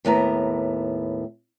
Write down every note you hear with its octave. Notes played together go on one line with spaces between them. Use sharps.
D#2 A2 B3 A#5